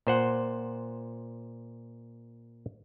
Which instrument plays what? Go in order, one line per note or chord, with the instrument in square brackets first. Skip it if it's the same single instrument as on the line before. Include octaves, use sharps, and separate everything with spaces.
[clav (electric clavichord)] A#2 C5 F#5